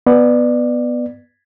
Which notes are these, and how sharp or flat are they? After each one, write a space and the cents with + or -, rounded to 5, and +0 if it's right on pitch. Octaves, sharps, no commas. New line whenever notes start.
B3 +0 D5 +20